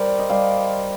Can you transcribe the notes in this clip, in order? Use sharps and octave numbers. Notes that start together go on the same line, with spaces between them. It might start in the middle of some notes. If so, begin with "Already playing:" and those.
Already playing: G3 A#4 C5 D5
D#5
G3 F5